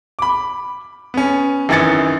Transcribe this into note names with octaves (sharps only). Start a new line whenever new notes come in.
B5 D6
B3 C#4
G#1 F#2 E3 D#4 A6 C#7